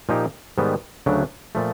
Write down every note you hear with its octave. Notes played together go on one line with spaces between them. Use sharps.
A#2 F3 A#3 D#4 G4
G#2 D#3 G3 B3
D2 C#3 F#3 A3 D4
A#2 F3 A3